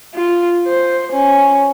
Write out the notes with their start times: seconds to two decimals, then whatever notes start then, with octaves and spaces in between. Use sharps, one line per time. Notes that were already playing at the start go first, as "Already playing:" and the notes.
0.15 F4
0.68 C5
1.12 C#4